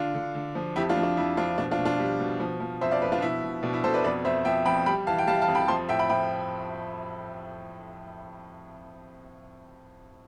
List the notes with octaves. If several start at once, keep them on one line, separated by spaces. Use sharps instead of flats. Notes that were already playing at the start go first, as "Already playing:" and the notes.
Already playing: D3 D4 F4
D3
D3
F3
F2 E4 G4
D4 F4
F3
D4
F2 E4
F3 D4 F4
B2 D4
D4 F4
B2
D4 F4
G3
B2
F3
F3
F2 C5 E5
D5 F5
F3 B4 D5
D4 F4
B2 E4
B2
B2 D4
E4
B2 A4 C5
B4 D5
F2 B4 D5
F2 C5 E5
F3 E5 G5
F2 G5 B5
G3 G5 B5
E3 F5 A5
G5
G3 F5 A5
F5 A5
F2
G5 B5
F3 A5 C6
A2 E5 G5
G5 B5
F3 G5 B5